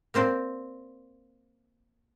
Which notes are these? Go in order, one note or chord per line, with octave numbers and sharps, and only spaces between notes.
A#3 C4 C5 D5